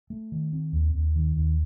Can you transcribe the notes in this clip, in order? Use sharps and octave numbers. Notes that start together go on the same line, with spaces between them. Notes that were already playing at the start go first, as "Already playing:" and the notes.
A3
D#3
C4
D#2
D#2
D#3
D#2